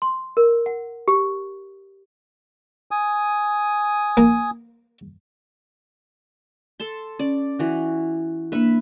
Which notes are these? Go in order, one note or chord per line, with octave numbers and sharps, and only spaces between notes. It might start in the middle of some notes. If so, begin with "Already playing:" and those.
C6
A#4
F#5
G4
G#5 D#6
A#3
A4 A5 C6
C#4 D5
E3 F#4
A#3 D4 B4 E5 B5